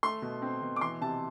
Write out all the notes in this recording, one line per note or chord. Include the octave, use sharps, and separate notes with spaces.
A3 C6
B2
C4
B2
D6
E3 C6
C3 A5